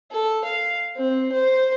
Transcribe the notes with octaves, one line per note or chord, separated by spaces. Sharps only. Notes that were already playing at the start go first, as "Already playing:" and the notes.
A4
F5
C4
C5